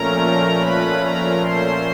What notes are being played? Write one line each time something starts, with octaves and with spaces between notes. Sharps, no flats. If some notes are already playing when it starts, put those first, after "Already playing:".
Already playing: A#2 F3 A3 C#4 A#4 A#5
B4 B5
A#4 A#5
C5 C6